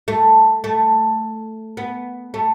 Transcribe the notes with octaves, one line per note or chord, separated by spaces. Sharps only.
A3
A3
B3
A3